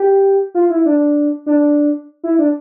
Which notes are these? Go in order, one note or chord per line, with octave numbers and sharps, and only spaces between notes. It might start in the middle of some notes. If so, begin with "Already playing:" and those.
Already playing: G4
F4
E4
D4
D4
E4
D4